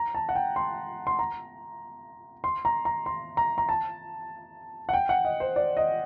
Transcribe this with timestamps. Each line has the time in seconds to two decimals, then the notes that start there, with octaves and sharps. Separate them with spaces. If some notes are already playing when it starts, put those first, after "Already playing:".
Already playing: A#5
0.15 A5
0.29 F#5
0.35 G5
0.56 C6
1.07 C6
1.19 A#5
2.44 C6
2.65 A#5
2.85 A#5
3.06 C6
3.37 A#5
3.58 A#5
3.69 A5
4.89 F#5
4.93 G5
5.09 F#5
5.25 D#5
5.40 C5
5.56 D5
5.77 D#5